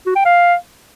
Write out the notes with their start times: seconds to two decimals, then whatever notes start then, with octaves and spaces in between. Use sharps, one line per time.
0.06 F#4
0.16 G5
0.25 F5